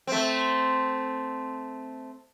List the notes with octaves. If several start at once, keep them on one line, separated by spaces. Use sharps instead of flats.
A3 C4